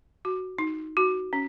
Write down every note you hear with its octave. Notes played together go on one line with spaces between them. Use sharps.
F#4
D#4
F#4
C#4